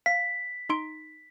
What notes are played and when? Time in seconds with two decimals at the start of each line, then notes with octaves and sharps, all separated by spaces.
0.06 F5 B6
0.69 D#4 C6 D7